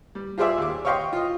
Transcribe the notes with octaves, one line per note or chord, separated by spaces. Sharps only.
G3
F4 G4 G#4 C5 D5 E5
D#2 D6
C#5 D#5 F5 G5 C6 C#6
F4 D#5